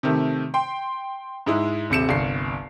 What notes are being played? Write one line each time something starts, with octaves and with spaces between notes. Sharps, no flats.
C3 D#3 A3
G5 C6
G#2 G#3 E4
D#1 C3 C#7 E7
G1 C2 C7